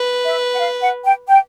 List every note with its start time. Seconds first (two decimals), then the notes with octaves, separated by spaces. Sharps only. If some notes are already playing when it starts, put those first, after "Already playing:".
Already playing: B4
0.25 E5
0.54 F#5
0.59 F5
0.82 F#5
1.05 G5
1.27 G5